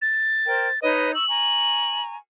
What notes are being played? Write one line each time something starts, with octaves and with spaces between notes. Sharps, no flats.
A6
A#4 C5 G5
D#4 B4 C#5 D#5
C#6 E6 F#7
G#5 A#5 C#6